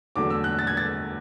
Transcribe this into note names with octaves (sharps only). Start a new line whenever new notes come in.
E2 D3 F#3 A3 D6
E6
F#6
A6
G#6
A6